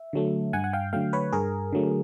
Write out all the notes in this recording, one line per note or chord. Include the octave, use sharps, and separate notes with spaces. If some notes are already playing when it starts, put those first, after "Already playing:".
Already playing: E5
D3 F#3 A3
G2 F#5 G#5
F#5
F5 G5
D3 F#3 A3 F5 G5
B4 C#5
G2 G#4 A#4
D3 F#3 A3